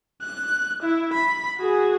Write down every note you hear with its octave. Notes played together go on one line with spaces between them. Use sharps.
F#6
E4
B5
F#4 G#4